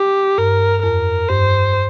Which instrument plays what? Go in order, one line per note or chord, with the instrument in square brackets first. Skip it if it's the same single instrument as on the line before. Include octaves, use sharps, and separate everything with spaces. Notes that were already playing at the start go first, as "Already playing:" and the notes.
Already playing: [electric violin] G4
[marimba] G2 [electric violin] A#4
[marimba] F2 [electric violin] A#4
[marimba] G2 [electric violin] C5